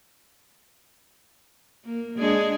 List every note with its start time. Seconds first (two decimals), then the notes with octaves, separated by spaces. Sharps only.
1.85 A#3
2.18 G#3 D4 G#4